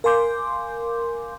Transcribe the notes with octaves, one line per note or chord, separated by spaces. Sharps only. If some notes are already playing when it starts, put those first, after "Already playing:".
A#4 F5 G#5 C6 D6 G6